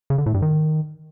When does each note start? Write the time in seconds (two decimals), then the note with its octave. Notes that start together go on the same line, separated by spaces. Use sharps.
0.10 C#3
0.18 D3
0.26 A2
0.34 G2
0.42 D#3